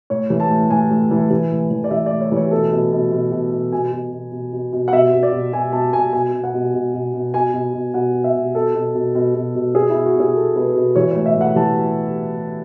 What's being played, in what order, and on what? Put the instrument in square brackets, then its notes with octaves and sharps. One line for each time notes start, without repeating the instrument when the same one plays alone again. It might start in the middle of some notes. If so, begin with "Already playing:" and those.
[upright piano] A2 C#5
E3
A5
A2
A2 G#5
A2
E3
E3
A2
E3
D5
E3 E5
D5
A2
C#5
E3 C#5
B2 A4
B2
B2
B2
B2
B2
B2 G#5
B2
B2
B2
B2
B2
F#5
B2 E5
B2
D5
B2
B2 G#5
B2 A5
B2 G#5
B2 G#5
B2
F#5
B2
B2
B2
B2
B2 G#5
B2
B2
B2 F#5
B2
E5
B2
B2 A4
B2
B2
B2
B2
B2
B2 G#4
E4
B2
F#4
B2 G#4
B2 A4
B2 B4
B2
E3 C#5
A2 C#5
E5
A2 F#5
E3 A5